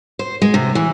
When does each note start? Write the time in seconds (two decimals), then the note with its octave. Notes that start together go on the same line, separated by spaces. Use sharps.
0.19 C5
0.42 G#3
0.54 C3
0.75 E3